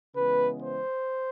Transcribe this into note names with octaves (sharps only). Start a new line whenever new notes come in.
C#3 E3 G#3 B3 B4
C5